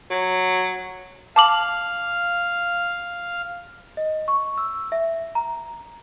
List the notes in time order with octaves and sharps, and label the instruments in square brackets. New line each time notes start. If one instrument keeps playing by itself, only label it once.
[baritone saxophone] F#3
[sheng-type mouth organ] F5 [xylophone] A5 D6 F#7
[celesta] D#5
C#6
E6
E5
A#5